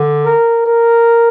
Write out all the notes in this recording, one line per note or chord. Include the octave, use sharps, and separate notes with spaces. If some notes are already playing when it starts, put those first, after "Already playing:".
Already playing: D3
A#4
A#4